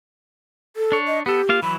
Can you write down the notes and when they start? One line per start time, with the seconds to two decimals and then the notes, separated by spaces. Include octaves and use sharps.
0.76 A4
0.92 D4 C#5
1.07 D#5
1.26 B3 G4 A4
1.49 A#3 F4 F5
1.62 E3 F#3 B5